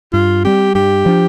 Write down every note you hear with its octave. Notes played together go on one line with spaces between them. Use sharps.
G2 F4
G3 C4 G4
G2 G4
F3 D4